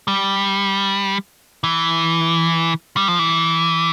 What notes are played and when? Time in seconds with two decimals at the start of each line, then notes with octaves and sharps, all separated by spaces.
0.08 G3
1.64 E3
2.97 G3
3.08 F3
3.19 E3